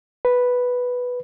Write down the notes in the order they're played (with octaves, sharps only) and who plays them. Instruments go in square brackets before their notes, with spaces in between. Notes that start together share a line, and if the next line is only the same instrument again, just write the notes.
[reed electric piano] B4